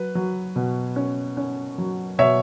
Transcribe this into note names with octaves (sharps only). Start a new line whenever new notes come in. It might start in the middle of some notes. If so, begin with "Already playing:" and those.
Already playing: F#3 B4
F#3
B2
C#4
C#4
F#3
B2 C#5 E5